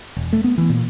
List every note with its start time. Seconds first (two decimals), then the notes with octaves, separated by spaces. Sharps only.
0.17 E1
0.33 A3
0.44 B3
0.58 E3
0.69 A#2